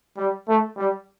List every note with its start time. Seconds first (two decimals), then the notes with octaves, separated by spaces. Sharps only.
0.17 G3
0.48 A3
0.77 G3